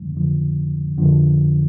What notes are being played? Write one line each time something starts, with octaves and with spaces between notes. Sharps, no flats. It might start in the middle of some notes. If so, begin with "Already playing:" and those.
Already playing: F2 D3 F3
F2 D3 F3
F2 D3 F3